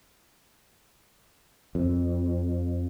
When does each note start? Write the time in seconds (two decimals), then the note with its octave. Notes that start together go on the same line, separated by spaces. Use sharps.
1.75 F2